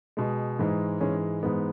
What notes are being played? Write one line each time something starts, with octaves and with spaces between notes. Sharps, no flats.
B2 G#3
G#2 E3 G#3
G#2 E3 G#3 C#4
G#2 E3 G#3 B3